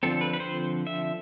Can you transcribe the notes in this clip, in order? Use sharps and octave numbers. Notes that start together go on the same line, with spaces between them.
D3 F3 C4 A4
B4
B4
C5
E5